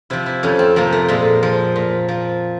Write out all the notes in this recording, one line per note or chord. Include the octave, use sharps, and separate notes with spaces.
C3 F3 E4
E4
F2 C#4
C4
C3 F3 A#3
A3
A#2 G#3
F3
A#2
F3